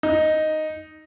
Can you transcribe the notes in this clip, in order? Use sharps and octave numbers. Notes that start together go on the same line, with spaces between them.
D#4